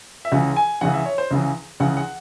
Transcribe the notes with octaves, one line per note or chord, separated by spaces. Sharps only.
E5
C#2 C#3 E3 F#5
G#5
C#2 C#3 E3 F#5
E5
C#5
C5
C#2 C#3 E3
C#2 C#3 E3 F#5
F#5